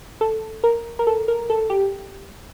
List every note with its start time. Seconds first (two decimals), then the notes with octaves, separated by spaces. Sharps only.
0.21 A4
0.64 A#4
0.99 A#4
1.07 A4
1.28 A#4
1.50 A4
1.70 G4